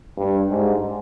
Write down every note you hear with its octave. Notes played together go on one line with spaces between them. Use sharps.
G2
G#2